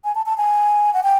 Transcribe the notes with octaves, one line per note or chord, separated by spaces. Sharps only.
G#5
A5
A5
G#5
F#5
G5